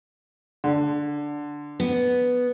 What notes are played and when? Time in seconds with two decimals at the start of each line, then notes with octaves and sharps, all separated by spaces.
0.64 D3
1.80 B3